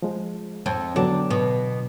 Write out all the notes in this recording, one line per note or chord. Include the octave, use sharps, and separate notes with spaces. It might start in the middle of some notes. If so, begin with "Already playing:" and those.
F3 G#3
F2
D3 F#3 B3 D4
B2